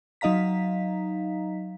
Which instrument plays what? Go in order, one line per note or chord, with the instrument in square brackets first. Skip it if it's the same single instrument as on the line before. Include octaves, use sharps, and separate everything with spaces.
[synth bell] F#3 D#4 D#5 F5 A#5 B6